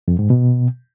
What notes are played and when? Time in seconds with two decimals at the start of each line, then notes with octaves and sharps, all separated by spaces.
0.08 F2
0.19 G#2
0.30 B2